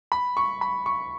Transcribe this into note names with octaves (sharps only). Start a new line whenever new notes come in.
B5
C#6
B5
C#6